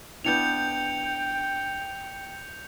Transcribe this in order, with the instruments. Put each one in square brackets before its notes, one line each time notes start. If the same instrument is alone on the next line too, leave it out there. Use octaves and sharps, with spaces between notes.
[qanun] B3 D4 E4 [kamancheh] G5 [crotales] G6 C#7 F7